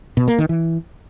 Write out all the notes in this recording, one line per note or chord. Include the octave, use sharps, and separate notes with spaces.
B2
A#3
D#3
E3